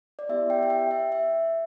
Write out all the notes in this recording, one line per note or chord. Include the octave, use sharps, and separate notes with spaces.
D5
B3 E4 G4 E5
G5
E5
G5
E5
E5